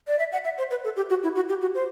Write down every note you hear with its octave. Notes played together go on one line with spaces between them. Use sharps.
D5
E5
F#5
E5
C5
B4
A4
G4
F#4
E4
F#4
G4
F#4
C5